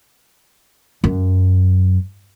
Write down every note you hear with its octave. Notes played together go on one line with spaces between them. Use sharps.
F#2